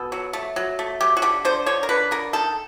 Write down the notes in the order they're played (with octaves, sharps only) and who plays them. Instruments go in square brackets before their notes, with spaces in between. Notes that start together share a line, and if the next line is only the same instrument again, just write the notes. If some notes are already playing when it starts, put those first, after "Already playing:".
Already playing: [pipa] B2 A4
F#3
A3
F#3
A3
F#3 G4
F#4
D3 G4
D3 C5
D3 C#5
A#4
D3 B4
D3 A#4
D#3 A4